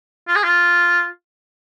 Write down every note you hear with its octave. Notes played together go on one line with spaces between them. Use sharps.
F4
G#4
F4